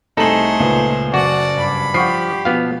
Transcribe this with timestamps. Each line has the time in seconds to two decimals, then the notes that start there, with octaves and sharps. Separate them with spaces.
0.17 C2 A3 D#4 G#4 A4 C5 F#7
0.60 C#2 A#2 B4
1.14 F#1 F#4 D5 F#5
1.55 G2 B5
1.94 F3 G4 F#5 C#6 C7
2.45 B2 F3 B3 F5